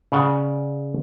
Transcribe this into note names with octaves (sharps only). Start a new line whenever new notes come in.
C#3 D5 F#5